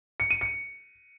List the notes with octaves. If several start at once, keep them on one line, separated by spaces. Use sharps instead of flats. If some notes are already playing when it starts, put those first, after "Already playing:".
C#7
D#7
C#7